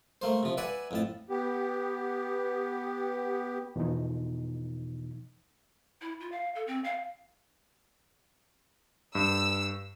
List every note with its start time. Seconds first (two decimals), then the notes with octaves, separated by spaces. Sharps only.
0.22 A3 A#3 C5
0.43 C3 F3
0.57 B4 D5 E5 F#5 G#5
0.91 F2 A2 A5
1.30 B3 G4
3.76 E2 B2 E3 F3 D#4
6.01 E4
6.20 F4
6.32 F5
6.55 A4
6.67 C4
6.84 F5
9.15 G2 E6